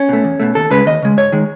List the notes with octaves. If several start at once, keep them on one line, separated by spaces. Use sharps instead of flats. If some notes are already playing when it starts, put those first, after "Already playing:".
Already playing: C#4
B2 A3
E2
B2 A3
D#2 A4
C#3 G#3 B4
D#2 D#5
C#3 G#3
G#2 C#5
D#3 G#3